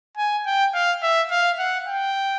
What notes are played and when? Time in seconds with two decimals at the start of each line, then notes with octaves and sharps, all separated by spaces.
0.17 G#5
0.46 G5
0.74 F5
1.03 E5
1.31 F5
1.59 F#5
1.87 G5